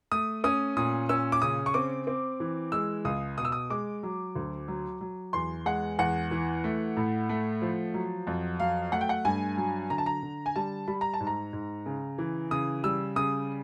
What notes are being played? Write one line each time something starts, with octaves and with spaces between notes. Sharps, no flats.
A3 D#6
C#4 D#6
A#2 D#6
C#4 E6
D6
C#3 D#6
C#6
C4 D6
C4
E3
G#3 E6
C#2 D#6
B2 D#6
E6
D#6
G#3 D6
F#3
D2
F#3
F#3
E2 C6
G#3 F#5
E2 F#5
E3
A3
A2
A3
F3
F#3
F2
F#3 F5
A3 F#5
G5
F#5
G2 G#5
F#3
D3 A#5
A5
A#5
D3
G#5
G3 A5
G3 B5
A#5
A5
G#2
A#5
G#2
C#3
E3
C#3 D#6
G3 E6
C#3 D#6